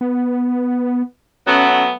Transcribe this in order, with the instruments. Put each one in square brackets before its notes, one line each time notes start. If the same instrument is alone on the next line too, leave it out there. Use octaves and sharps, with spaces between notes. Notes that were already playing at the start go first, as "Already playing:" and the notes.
[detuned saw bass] B3
[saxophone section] F#3 A3 B3 [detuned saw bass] C#4